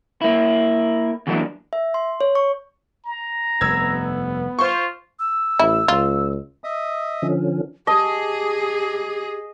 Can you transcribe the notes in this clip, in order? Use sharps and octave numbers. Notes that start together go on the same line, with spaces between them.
A#3 E4
E2 E3 F#3 A#3 D4
E5
C6
C#5
C#6
A#5
F1 G2 B3 E6 G#6
F4 C5 C6 C#6
E6
A1 E4
C#2 F4
D#5 E5 D#6
D3 F3 C#4
G4 G#4 D#5 A5